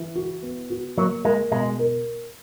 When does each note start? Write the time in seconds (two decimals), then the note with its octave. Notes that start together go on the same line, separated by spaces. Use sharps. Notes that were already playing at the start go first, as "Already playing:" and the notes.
Already playing: E3
0.15 F#4
0.43 B3
0.70 F#4
0.97 F#3 A#3
1.25 G#3 A#4
1.51 B2 G#3
1.79 A#4